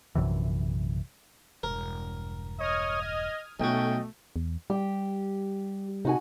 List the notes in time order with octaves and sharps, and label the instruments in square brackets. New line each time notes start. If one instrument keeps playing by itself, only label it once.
[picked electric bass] A#1 F#2 C3 E3
[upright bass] E1 G2 [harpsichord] A#4
[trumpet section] C#5 D#5 [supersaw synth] D#6 F6 G#6
[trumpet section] D#5
[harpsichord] B1 F#4 [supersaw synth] A3 [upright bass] A#3 [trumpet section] C#4 D#5 G5
[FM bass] E2
[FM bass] G3 [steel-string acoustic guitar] G4
[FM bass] C3 [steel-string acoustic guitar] D#4 F#4 G#5